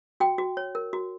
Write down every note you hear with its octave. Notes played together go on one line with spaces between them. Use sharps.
F#4 G5
F#4
C#5
A#4
F#4